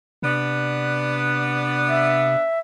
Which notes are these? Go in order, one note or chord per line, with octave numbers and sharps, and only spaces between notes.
C3 B3 D4
E5